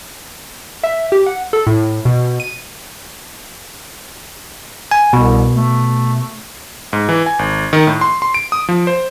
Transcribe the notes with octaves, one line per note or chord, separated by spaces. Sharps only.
E5
G4
F#5
A4
A2
B2
D#7
G#5
C2 B2
A3
G#2
E3
G#5
G#1
D#3
A2
C6
C6
D7
D#6
F3
C5